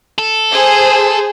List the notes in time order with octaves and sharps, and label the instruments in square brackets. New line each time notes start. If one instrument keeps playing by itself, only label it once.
[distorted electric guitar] A4
[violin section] G#4 C5